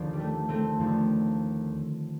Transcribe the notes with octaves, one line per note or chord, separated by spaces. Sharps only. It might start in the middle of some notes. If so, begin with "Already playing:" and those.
Already playing: D#2 D3 F3
G3
A3
A3 C4
D#2 D3 F3